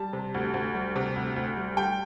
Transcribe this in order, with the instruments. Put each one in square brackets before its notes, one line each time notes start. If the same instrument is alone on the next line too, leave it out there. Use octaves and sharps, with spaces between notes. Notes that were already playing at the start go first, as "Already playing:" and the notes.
Already playing: [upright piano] G3 A5
C3
D2
D2
G3
C3
D2
D2
G3
G3 G5